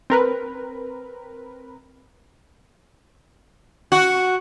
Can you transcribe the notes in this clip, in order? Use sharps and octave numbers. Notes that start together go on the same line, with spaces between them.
C4 A#4 B4
F#4